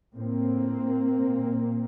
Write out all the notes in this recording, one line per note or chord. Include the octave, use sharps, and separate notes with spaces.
A2 A#3 C4
A#2